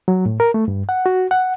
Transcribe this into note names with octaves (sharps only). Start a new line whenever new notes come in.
F#3
A2
A#4
A3
G2
F#5
F#4
F#5